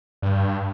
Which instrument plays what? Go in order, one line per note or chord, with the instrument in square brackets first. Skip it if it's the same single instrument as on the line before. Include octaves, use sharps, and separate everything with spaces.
[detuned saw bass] G2